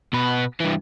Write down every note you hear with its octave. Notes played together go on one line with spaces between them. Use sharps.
B2 B4
G2 E3